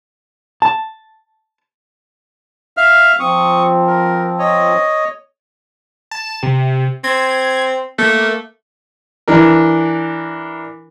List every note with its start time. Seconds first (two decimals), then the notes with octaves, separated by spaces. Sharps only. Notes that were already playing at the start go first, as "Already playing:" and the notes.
0.62 A5
2.77 E5 F5 F6
3.20 F3 C4 C#6 D#6
3.87 A#4
4.39 C#5 D#5
6.11 A5
6.43 C3
7.04 C4 G#6
7.98 A3 A#3
9.28 E3 D4 A#4